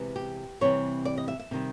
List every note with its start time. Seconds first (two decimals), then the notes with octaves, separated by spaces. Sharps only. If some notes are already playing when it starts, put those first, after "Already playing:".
Already playing: C3 E3 G#3 B3
0.16 G4
0.61 C3 E3 G3 C4 C#5
1.05 D5
1.17 D#5
1.28 E5
1.39 E5
1.51 C3 D#3 G3